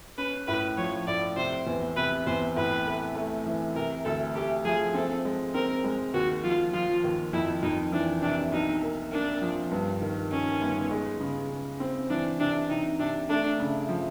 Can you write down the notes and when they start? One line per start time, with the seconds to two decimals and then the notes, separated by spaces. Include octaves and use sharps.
0.18 C#4 B4
0.47 A2 B4
0.77 F3 C#5
1.07 A2 D5
1.37 C3 C5
1.67 E2
1.96 C3 B4
2.26 E2 C5
2.56 A2 B4
2.87 A3
3.15 A3
3.46 E3
3.75 C3 A#4
4.05 D2 A4
4.35 A3 G4
4.65 F3 G#4
4.94 C4 A4
5.25 G#3
5.54 C4 A#4
5.84 G#3
6.14 D#2 F#4
6.44 F3 F4
6.73 F3 F4
7.04 D#2
7.33 F2 E4
7.63 F2 D#4
7.92 E3 D4
8.22 C3 D4
8.52 B1 D#4
8.83 A#3
9.12 A#3 D4
9.42 F3
9.71 G2
10.02 D#3
10.31 D#3 C#4
10.61 G1
10.91 G#3
11.20 C#3
11.51 C#3
11.80 C4
12.10 E3 D4
12.40 C3 D4
12.70 C3 D#4
12.99 C3 D4
13.29 A3 D4
13.60 C#3
13.89 F3